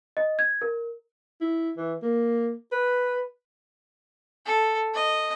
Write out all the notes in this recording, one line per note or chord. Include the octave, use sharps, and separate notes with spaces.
D#5
G#6
A#4
E4
E3
A#3
B4
A4
D#5